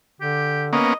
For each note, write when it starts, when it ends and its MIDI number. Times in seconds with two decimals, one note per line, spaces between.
0.21 0.77 50
0.21 0.67 67
0.73 0.94 58
0.73 0.94 59
0.73 0.94 61
0.73 0.96 75